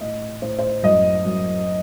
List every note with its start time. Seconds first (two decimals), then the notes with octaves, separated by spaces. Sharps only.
0.01 A2 D#5
0.41 A2 C5
0.59 C5
0.83 F#2 D#5
1.25 F#2